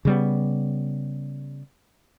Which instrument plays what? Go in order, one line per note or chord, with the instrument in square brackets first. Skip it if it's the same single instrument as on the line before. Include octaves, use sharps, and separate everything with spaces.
[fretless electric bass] C#3 G3 B3